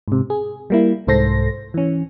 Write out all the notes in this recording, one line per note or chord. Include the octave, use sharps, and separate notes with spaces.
G#2 C3
G#4
G3 A#3 E4
C2 G#2 A4 C5 C6 A#6
E3 C#4